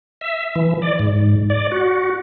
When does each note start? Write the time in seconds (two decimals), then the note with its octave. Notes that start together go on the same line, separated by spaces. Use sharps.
0.21 E5
0.56 E3
0.82 D5
0.99 G#2
1.50 D5
1.72 F#4